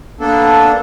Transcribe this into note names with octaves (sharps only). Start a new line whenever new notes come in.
A#3 B3 D4 A4